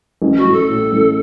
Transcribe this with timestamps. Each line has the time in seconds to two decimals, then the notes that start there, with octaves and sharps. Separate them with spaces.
0.22 A1
0.37 F#4
0.45 A1
0.53 A4
0.68 A2
0.92 A1